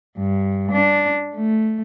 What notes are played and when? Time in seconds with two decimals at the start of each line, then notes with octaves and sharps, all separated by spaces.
0.17 G2
0.71 D4
1.35 A3